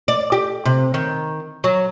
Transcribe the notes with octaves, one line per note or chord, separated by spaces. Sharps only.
D5
G4
C3
D#3
F#3